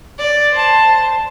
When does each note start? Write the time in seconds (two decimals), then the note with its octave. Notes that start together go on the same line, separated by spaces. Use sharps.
0.19 D5
0.54 C5 A5